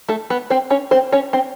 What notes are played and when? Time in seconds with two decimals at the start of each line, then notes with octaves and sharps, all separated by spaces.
0.09 A3 A4
0.30 B3 B4
0.50 C4 C5
0.71 C#4 C#5
0.91 C4 C5
1.12 C#4 C#5
1.33 C4 C5